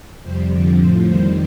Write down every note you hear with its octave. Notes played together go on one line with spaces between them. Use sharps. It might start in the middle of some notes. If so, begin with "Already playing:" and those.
F2 C3 G3 C5
F2 D3 F3 D5
A2 F3 C5
F2 D#3 G3 C5